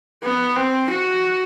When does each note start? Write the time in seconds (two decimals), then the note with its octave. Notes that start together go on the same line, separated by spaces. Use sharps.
0.23 B3
0.56 C4
0.90 F#4